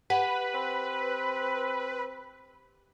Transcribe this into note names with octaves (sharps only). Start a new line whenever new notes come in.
G4 B4 F#5 G#5
C4